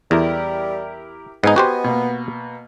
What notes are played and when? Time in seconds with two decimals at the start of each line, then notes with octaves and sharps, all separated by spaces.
0.11 E2 G3 E4 G4 A#4
1.44 G#2 B3 D#4 D#5 G#5
1.56 F#4 G4 C5
1.84 B2 A#3